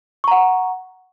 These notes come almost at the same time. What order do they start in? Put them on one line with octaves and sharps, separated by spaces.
C#6 A#5 F#5